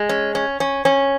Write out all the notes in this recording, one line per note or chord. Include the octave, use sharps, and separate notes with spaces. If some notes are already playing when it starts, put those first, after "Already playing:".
Already playing: G#3
C#4
C#4
C#4
C#4